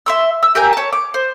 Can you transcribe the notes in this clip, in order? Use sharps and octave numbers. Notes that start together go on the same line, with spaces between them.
E5 C6 E6
E6
G4 A#4 G5 G#5
C#5 A5
D6
C5